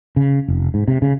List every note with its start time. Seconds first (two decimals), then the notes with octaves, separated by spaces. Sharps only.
0.16 C#3
0.48 F1
0.74 G#2
0.88 C3
1.02 C#3